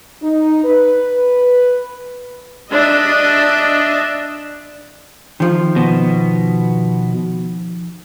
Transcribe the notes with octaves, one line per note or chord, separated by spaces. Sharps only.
D#4
B4
D4 D#5 E5
D#3 F3
B2 B3